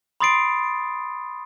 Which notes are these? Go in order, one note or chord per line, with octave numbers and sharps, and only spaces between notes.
B5 C6 D#6 A6 C7 D7